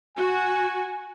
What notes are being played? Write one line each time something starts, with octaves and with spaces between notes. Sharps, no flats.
F#4 G#5